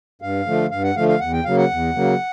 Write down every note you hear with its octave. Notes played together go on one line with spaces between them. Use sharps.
G2 F5
D3 F3 A3
G2 F5
F#5
D3 F3 A3 F5
F5
E2 F#5
G5
C#3 F#3 A#3 F5
F#5
E2
C#3 F#3 A#3